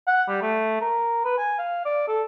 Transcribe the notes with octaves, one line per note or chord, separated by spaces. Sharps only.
F#5
G3
A3
A#4
B4
G#5
F5
D5
A4